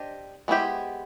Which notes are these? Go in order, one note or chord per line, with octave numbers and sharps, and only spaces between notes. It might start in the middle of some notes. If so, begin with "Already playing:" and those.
Already playing: D4 G4 C5 D#5
G#3 B3 E4 G4 C5